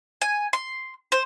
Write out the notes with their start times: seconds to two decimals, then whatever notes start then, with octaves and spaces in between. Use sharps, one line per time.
0.21 G#5
0.53 C6
1.12 C5